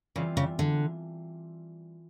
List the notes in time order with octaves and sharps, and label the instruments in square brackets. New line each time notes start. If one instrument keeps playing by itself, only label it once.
[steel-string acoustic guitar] C#3 [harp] E3 G3 C4 F4
[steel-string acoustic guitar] C#3
D3